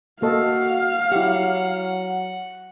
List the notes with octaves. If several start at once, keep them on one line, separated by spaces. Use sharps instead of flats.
A#3 F#4 A4 D#5 F5
F#3 E4 G4 F#5